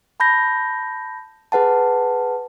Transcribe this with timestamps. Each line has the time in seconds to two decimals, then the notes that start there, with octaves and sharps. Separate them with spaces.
0.20 A5 B5 G6 A#6
1.52 G#4 B4 F#5 A5